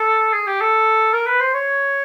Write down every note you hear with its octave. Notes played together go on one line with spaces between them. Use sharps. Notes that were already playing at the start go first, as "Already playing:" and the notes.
Already playing: A4
G#4
G4
A4
A#4
B4
C5
C#5